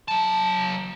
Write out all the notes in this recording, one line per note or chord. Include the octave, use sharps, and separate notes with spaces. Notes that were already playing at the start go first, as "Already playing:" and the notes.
F#3 A5